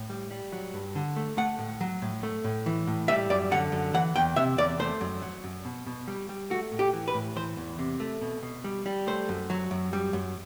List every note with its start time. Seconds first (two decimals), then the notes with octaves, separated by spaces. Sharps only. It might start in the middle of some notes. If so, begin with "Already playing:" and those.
Already playing: A2
0.10 G3
0.31 G3
0.53 F#3
0.74 G2
0.95 D3
1.16 A3
1.37 A3 F#5
1.59 A2
1.81 F#3
2.02 A2
2.23 A3
2.44 A2
2.66 E3
2.87 A2
3.08 G3 E5
3.30 F#2 D5
3.51 D3 F#5
3.72 F#2
3.94 E3 F#5
4.16 E2 G5
4.36 C3 E5
4.58 E2 D5
4.79 A3 C5
5.01 F#2
5.22 F#3
5.44 F#2
5.65 B2
5.87 B2
6.08 G3
6.29 G3
6.50 A3 F#4
6.72 A2
6.79 G4
6.93 E3
7.08 B4
7.14 A2
7.36 E3 C5
7.57 E2
7.79 C3
8.00 A3
8.22 B2
8.43 B2
8.64 G3
8.86 G3
9.07 A3 C5
9.29 F#2
9.50 F#3
9.71 F#2
9.93 G3
10.13 F#2